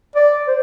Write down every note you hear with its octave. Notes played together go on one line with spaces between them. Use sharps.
D5
C5